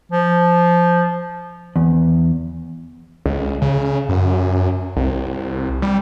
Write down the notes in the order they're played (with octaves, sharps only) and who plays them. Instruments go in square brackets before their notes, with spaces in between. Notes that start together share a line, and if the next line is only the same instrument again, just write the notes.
[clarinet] F3
[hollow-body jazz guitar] E2
[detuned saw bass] C#2
C#3
F#2
C2
G3